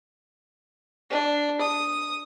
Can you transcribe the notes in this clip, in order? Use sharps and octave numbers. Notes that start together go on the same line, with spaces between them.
D4
D#6